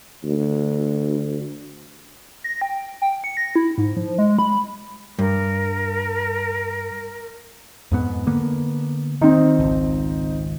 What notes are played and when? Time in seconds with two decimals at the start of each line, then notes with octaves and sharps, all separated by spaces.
0.24 D2
2.44 A#6
2.61 G5
3.02 G5
3.24 C#7
3.37 A#6
3.55 E4
3.78 G#2
3.96 F3
4.18 G#3
4.39 B5
5.19 G2 A#4
7.91 F2 G#2 B3
8.26 D3 A#3 B3
9.22 D#3 C4 D#4
9.59 G#1 C#2